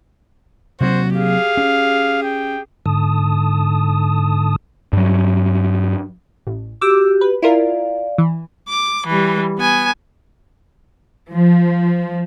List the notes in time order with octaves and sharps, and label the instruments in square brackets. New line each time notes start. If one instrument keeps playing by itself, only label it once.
[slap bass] C3 F#3 A#3 [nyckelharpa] F#4 [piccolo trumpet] C5
[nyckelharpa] G4 G#4 [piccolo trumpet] F5
[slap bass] C#4
[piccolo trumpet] G5
[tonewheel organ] G#2 D3 A5 D#6
[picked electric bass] G2 F#3
[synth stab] A1
[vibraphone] F#4 G4 [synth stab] D6 E6
[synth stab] B4
[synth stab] E4 F4 A#4 [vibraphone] D5 F5
[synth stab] E3
[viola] D6
E3 G3
B3 G#5
[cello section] F3